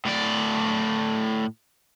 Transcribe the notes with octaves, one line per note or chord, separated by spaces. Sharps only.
A2 D5